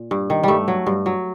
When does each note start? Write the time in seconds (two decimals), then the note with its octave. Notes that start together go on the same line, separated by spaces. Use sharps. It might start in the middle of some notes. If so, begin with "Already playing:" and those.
Already playing: A#2
0.11 G2
0.30 D#3
0.43 G2 G3 A3
0.68 F#3
0.86 G2
1.06 F#3